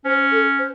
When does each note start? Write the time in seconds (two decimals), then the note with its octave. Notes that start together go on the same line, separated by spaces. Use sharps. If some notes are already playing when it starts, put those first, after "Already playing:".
0.05 C#4 C5
0.32 A4
0.59 C5